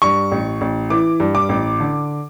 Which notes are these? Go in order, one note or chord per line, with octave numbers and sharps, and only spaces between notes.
G2 C#6
A1
A1
E3 D6
G2
D6
A1
D3